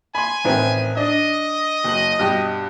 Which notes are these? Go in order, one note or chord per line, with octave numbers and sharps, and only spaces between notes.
G#5 B5 C6
A1 D#3 C4
D4 D#5
F#1 F#7
G2 B2 G4